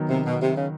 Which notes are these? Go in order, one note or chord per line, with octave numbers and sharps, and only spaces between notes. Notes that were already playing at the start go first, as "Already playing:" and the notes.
Already playing: D#3 F#3 B3 D#4
C3
B2
C3
C#3